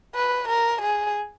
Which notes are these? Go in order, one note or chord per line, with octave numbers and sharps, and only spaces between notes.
B4
A#4
G#4